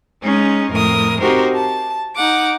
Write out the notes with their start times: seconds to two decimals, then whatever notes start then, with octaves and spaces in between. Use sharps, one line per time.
0.23 G#3 C#4 D#4
0.71 F2 A2 A#4 D#6
1.20 C4 D#4 F#4 G4 A#4 C5
1.54 A5
2.15 D#4 F#5 D6